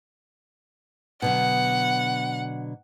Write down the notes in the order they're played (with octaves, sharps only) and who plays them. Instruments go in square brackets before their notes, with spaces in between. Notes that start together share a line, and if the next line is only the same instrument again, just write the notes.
[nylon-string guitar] B2 D3 F#3 [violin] F#5